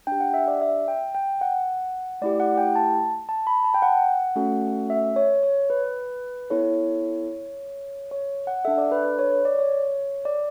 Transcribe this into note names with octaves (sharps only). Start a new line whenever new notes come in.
D4 G4 G5
F#5
E5
D5
E5
G5
G5
F#5
A3 E4 G4 D5
F#5
G5
A5
A5
B5
A5
G5
F#5
A3 C#4 F#4 A4
E5
C#5
C#5
B4
B3 E4 A4 C#5
C#5
F#5
D4 A4 E5
D5
B4
B4
C#5
C#5
D5
C#5
D5